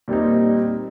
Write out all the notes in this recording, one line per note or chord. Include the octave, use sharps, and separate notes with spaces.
A#2 G3 C4 D#4